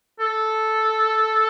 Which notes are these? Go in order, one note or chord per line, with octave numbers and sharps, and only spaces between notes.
A4